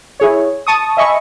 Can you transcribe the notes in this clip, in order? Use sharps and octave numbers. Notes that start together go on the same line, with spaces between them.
E4 G#4 C#5
A5 C#6 D#6
D#5 E5 G#5 B5 C#6